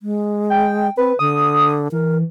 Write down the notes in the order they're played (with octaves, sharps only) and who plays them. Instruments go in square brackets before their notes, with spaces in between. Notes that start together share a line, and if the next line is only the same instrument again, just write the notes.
[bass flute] G#3
[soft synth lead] G5
[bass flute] C4 [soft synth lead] B4
[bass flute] D3 [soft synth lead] D#6
[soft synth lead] E3 [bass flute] A#4